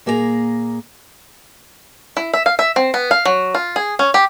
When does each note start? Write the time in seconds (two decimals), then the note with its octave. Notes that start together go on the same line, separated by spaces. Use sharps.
0.06 A#2 A#3 G#4 B4 A#5
2.17 E4
2.33 E5
2.46 F5
2.59 E5
2.76 C4
2.94 B3
3.11 F5
3.25 F#3
3.54 F4
3.76 G#4
3.99 C#4
4.14 G4